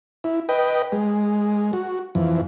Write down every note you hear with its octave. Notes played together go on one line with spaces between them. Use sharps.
E4
B4 D#5 G5
G#3
F#4
F2 E3